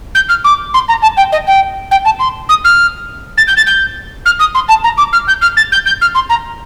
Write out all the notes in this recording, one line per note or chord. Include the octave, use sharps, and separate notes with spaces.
G6
F6
D6
C6
A#5
A5
G5
D#5
G5
G5
A5
C6
D#6
F6
A6
G6
A6
G6
F6
D#6
C6
A5
A#5
D6
F6
G6
F6
A6
G6
G6
F6
C6
A#5